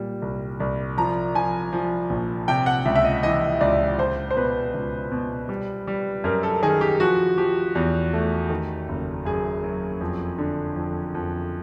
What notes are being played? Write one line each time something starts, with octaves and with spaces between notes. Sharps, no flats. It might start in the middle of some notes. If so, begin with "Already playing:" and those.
Already playing: A#2 G3
C2
C2
F3 A#5
F3 G#5
F3
A#1
C3 G5
F#5
C#2 E5
E5
D#5
E3 D#5
C#2 D5
C#2 C5
C5
B2 B4
C#2
B2
G3
G3
F#2 A#4
A4
D#3 G#4
G4
F3 F#4
F3 G4
E2
A3
D#3
F#1
F#2 G#4
F#3
F2
D3
F2
F2